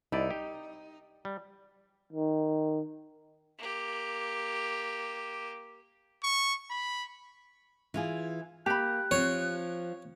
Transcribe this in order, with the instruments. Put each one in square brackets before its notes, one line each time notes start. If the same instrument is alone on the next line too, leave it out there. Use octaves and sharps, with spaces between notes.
[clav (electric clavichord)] C2 E4 D5 [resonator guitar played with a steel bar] D#4
[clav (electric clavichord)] G4
G3
[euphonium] D#3
[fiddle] A#3 G4
[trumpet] C#6
B5
[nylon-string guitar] E3 F4 G#4
[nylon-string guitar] A#3 [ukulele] G4 B5 [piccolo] F#6
[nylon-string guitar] F3 C4 [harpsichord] C#5